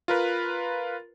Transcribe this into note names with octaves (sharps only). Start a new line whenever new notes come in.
F4 A#4 B4